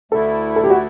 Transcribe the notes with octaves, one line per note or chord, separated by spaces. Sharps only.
D2 D3 A3 E4 A4
A4
G4
F#4